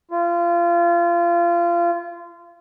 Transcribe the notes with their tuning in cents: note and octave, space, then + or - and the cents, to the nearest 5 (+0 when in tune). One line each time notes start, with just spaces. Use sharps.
F4 -25